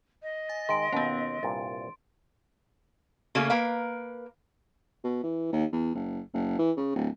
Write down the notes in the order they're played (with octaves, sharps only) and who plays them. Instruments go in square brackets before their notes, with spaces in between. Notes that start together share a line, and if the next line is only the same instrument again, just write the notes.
[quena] D#5
[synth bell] G#5 A6
[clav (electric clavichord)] D#3 G#3 [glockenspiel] C6 D7
[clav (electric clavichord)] D#2 B2 [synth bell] B3 C#4
[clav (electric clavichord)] C2 G2 A#2 [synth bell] A6
[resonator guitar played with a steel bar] C#3 A3 A#3 C#4 G#4
A#3 A#4 B4 F5
[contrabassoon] B2
E3
D#2
E2
F#1
F#1
E3
C#3
D1